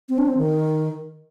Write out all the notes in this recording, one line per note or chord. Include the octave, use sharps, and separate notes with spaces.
C4
D4
C4
D#3